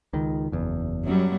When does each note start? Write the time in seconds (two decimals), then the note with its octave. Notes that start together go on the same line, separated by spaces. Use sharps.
0.13 C#2 D#3
0.52 F#1 E2
1.04 F#2 F#3 G3